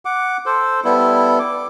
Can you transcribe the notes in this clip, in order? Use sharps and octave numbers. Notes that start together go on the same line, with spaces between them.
F#5 D6
A4 C5
G3 B3 E4 A4
D6